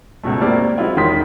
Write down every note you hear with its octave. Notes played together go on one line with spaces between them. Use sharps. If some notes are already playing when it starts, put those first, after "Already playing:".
C#2 B2 A3
G3 A#3 C4 E4 A#4 D5
F#3 G#3 C4 E4 F4
E1 D#3 C6 D#6 B6